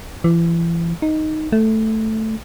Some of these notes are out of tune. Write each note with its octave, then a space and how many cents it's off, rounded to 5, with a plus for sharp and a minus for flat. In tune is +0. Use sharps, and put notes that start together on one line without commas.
E3 +35
D#4 +0
A3 +0